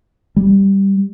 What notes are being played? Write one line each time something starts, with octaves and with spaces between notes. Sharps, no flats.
G3